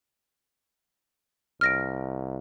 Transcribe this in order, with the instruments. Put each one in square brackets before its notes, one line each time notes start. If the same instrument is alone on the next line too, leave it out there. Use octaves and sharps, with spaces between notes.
[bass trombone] C2 [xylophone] F6 A#6 D7